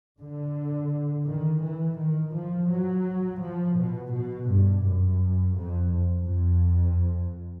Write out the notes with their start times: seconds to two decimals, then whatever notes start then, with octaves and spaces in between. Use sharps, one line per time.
0.19 D3
1.26 D#3
1.62 E3
1.98 D#3
2.33 F3
2.70 F#3
3.40 F3
3.76 B2
4.12 B2
4.48 G2
4.83 F#2
5.56 F2
6.26 F2